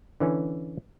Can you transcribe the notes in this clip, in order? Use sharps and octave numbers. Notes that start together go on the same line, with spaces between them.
D3 E3 C#4